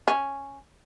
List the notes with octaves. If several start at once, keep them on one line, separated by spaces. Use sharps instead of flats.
C#4